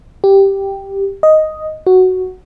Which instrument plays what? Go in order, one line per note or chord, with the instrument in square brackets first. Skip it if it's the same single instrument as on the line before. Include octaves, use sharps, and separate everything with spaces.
[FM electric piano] G4
D#5
F#4